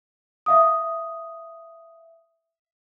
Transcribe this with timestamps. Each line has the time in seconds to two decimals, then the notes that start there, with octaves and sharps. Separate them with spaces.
0.46 E5 F5 D#6